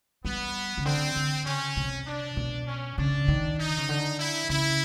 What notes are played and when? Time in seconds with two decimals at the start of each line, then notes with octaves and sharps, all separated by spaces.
0.25 G3 B3
0.78 C#3
0.85 D3 C4
1.16 D3
1.46 C#3 C#4
1.77 C3
2.07 D4
2.37 B2
2.67 C#4
2.98 C#3 D4
3.28 D#3
3.59 D#4
3.77 C#3
3.89 D3
4.19 E4
4.49 C#3 E4